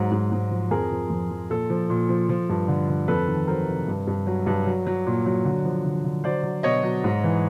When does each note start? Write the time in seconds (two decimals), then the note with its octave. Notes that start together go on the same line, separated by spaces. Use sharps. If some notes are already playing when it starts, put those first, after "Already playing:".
Already playing: G#2 F#3
0.11 G#2
0.32 G#2
0.51 F3
0.71 F2 G#4 A#4
0.92 F3
1.10 F2
1.30 F3
1.50 A#2 A4
1.70 F3
1.90 A#2
2.09 F3
2.29 F3
2.49 G2
2.68 D3
2.89 D3
3.08 F2 A4 B4
3.28 D#3
3.47 F#3 A#4 C5
3.68 C3
3.88 G2
4.07 G2
4.27 F#3
4.46 G2
4.66 F#3
4.87 F#3
5.06 A#2
5.26 F#3
5.45 D3
5.65 F3
5.84 D3
6.04 D3
6.24 F#3 C5 D5
6.43 F#3
6.63 B2 C#5 D#5
6.83 F#3
7.04 G#2
7.23 E3